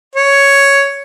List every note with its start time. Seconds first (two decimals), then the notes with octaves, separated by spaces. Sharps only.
0.15 C#5